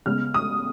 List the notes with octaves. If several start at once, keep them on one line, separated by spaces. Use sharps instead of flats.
C#3 G#3 B3 F6
D#6